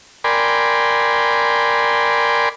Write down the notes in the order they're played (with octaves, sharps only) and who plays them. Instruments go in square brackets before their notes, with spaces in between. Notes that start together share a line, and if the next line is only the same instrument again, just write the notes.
[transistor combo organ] A#4 D5 G5 G#5 B5 C6